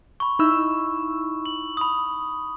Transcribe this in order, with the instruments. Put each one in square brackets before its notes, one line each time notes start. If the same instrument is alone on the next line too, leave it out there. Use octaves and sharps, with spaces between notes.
[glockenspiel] B5 C#6
[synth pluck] D#4 E4 E6 [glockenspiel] B5
[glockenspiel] F#7
B5 D#6